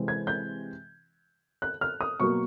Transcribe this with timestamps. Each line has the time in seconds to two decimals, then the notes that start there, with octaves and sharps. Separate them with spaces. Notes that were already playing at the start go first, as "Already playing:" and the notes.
Already playing: C3 E3 G#3 C4
0.08 G#6
0.27 G6
1.62 F#6
1.81 F6
2.01 D#6
2.20 B2 F#3 A#3 C#6